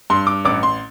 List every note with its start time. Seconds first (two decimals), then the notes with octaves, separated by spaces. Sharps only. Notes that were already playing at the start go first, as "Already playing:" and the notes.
0.10 G2 C6
0.27 D6
0.45 A1 D6
0.63 C6